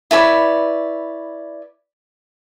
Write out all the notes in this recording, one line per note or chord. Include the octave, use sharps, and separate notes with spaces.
E4 B4 C#5 D5